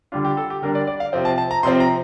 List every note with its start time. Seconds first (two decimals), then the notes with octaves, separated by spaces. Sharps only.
0.12 D3 G3 D4 F4
0.25 G4
0.37 A4
0.50 G4
0.62 D3 G3 D4 A#4
0.75 D5
0.87 D5
1.00 F5
1.13 C3 F3 C4
1.25 A5
1.38 A5
1.51 A#5
1.63 C3 F3 C4 C6
1.80 A#5